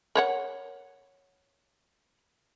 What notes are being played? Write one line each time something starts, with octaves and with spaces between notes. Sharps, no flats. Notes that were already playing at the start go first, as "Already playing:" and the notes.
A#4 C#5 F#5